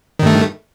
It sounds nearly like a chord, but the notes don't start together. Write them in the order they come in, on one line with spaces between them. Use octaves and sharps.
D#3 G2 A3